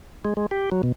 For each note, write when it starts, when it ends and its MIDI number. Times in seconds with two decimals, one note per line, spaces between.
0.25 0.34 56
0.37 0.46 56
0.51 0.70 67
0.72 0.82 54
0.83 0.92 47